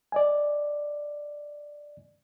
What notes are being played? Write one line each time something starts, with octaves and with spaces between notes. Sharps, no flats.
D5 D#5 G#5